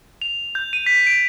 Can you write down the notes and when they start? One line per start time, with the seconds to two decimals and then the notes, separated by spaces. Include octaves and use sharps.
0.22 F7
0.55 G6
0.73 D#7
0.86 B6
1.07 D7